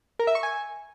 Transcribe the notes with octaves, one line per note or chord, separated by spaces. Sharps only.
A#4
E5
C#6
G#5